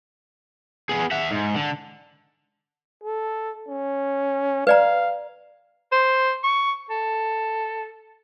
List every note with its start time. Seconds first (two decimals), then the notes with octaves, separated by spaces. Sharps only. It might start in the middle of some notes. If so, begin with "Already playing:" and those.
0.89 B3 G#4
1.11 E5 F#5
1.31 G#2
1.56 D3
3.04 A4
3.68 C#4
4.67 B4 D5 F5 A#5
5.92 C5
6.44 C#6
6.90 A4